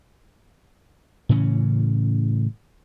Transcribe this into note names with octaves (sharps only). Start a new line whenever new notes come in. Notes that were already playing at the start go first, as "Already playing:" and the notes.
A2 C#3 E3 C#4